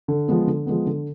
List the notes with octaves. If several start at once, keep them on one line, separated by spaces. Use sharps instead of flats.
D3
F3 G#3 B3
D3
F3 G#3 B3
D3